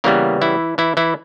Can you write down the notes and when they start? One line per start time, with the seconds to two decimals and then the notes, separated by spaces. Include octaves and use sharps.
0.04 C#3 E3 G3 A#3 B3 A#4
0.41 E3 E4
0.78 E3 E4
0.97 E3 E4